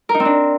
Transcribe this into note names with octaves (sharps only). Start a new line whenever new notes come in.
A#4
D#4
C4
D4